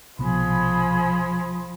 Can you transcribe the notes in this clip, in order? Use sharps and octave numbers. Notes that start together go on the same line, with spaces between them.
B1 C3 F3 B3 G#4 B5